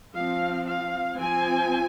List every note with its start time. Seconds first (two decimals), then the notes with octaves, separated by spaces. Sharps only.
0.15 F3 C4 F5
0.66 F5
1.18 F3 C4 G#5